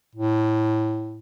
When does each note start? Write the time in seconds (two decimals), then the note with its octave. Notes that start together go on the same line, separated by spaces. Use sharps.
0.16 A2